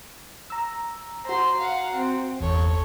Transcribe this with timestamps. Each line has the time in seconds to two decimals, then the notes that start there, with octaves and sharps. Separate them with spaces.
0.50 A#5 E6
1.25 F#4 C5 A#5 C6
1.58 F5 F#5
1.94 C4
2.40 G1 E2 A4 C#5